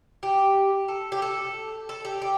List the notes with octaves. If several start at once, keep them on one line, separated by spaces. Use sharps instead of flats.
G4
A4
G4
A4
A4
G4
G4